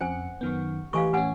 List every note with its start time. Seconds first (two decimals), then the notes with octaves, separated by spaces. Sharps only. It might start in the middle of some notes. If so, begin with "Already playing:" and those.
0.01 F2 C#4 C5 F#5 G#5 C#7
0.41 F#2 D#3 B3 C#6 F6 G6
0.93 E3 A3 G4 B4 D#5 F5 G#5 C#6
1.13 A2 C#4 B4 F#5 G#5 G#6